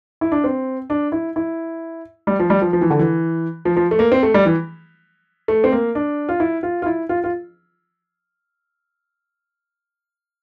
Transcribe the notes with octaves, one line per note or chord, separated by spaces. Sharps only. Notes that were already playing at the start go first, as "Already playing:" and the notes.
E4
D4
C4
D4
E4
E4
G3
F3
G3
F3
F3
E3
D3
E3
F3
F3
A3
A#3
C4
A3
G3
E3
A3
C4
A#3
D4
F4
E4
F4
F4
E4
F4
F4